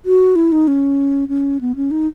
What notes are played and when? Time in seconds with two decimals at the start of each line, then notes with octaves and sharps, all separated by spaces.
0.05 F#4
0.36 E4
0.52 D#4
0.68 C#4
1.29 C#4
1.61 B3
1.76 C#4
1.91 D#4